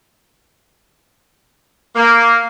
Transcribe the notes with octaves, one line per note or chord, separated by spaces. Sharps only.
A#3